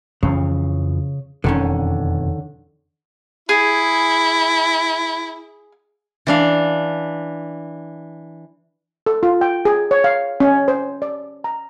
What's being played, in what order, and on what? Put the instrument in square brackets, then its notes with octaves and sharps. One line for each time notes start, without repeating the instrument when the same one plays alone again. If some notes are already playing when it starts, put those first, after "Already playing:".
[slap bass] F2 E3 F3 [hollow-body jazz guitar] C#3
[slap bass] E1 F2 [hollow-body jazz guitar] D3 D#3 C#4
[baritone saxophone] E4 [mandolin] G#4
[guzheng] E3 D4 F5
[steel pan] A4
F4
G5
G#4
C#5
F5
C#4
C5
D5
A#5